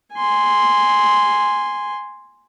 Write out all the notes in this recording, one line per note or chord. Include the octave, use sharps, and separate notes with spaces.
G#5 C6